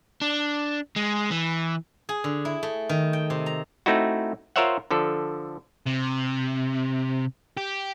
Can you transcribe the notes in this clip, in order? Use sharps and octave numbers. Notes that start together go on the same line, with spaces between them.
D4
G#3
E3
G#4
D3
E4
A3
D#3
G5
C3
A#5
A3 C4 D#4 E4 F#4
F4 A#4 C5 C#5 E5 F#5
D3 F3 A4
C3
G4